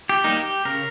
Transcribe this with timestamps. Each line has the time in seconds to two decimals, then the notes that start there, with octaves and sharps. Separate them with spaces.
0.09 G4
0.24 G3 A#3 D#4
0.37 G4
0.65 C#3 A#4